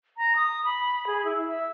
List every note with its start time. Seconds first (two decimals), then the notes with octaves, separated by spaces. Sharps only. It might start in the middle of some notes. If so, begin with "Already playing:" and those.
0.17 A#5
0.36 D#6
0.65 B5
1.07 G#4
1.25 E4
1.47 E5